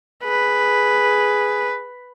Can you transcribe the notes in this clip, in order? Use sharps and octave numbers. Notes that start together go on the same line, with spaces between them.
G#4 B4